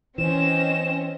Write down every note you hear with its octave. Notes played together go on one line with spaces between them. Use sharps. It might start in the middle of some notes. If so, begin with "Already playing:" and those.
E3 C4 C#4 D#5 E7